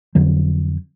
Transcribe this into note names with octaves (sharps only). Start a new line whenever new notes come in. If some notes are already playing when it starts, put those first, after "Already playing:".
F2 D3 F#3